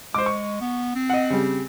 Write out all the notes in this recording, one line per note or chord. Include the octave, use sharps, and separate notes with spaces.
G#3 C5 D6
C#6
B3
C4
D#5 F#5
C#3 G3